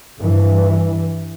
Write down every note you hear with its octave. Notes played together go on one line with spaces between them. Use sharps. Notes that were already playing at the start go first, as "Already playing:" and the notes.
G2 E3